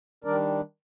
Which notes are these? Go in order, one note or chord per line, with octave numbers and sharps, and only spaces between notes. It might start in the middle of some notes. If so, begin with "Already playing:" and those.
D#3 G3 D4 A#4 D5